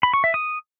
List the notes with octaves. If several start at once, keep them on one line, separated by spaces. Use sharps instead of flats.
B5
C#6
E5
D#6